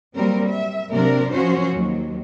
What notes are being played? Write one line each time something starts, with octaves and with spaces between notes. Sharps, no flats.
F#3 G3 A#3 C4 A#4
E5
C3 F#3 A#3 C4 D4 A#4
F3 F#3 C#4 F#4 C5 C#5
D#2 F#3